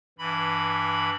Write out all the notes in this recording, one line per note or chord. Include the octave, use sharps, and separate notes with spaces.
G2 E3 B5